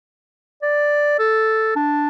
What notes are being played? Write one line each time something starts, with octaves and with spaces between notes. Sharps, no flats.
D5
A4
D4